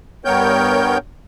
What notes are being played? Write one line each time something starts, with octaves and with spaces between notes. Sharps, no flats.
G2 B3 A#4 C#5 G5 G6